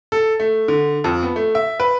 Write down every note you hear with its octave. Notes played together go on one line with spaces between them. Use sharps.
A4
A3
D3
F2
B3
A3
E5
B4